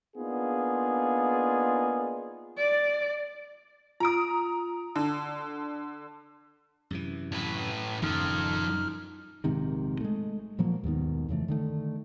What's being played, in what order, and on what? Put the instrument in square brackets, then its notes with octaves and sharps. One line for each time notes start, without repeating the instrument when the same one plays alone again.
[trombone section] A#3 B3 D4 D#4 F4 G#4
[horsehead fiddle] D5
[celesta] F4 D7 [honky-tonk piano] A#5 D#6
[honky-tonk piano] D3 [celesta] A5
[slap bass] F#2 C3 E3
[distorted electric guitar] A2 B4
[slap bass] D#1 C#3 [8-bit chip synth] F#2 D#4 F6 [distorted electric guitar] F3 A4
[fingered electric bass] A#1 G#2 C3 D#3
G#3 A3
A#2 F3 F#3 A#3
D#2 G#2 B2 D#3
F2 C#3 E3 A3
D3 D#3 A3